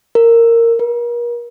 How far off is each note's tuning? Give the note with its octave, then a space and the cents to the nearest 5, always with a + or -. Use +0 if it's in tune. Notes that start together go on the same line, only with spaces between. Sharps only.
A#4 -15
A#4 +40